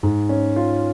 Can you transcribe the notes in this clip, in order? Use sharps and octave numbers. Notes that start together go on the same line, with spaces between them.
G#2
C#4
F4